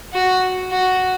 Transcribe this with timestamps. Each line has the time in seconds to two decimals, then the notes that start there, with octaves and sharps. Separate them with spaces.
0.13 F#4
0.71 F#4